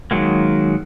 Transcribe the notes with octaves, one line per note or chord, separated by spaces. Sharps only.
D#3 F#3 G#3 A#3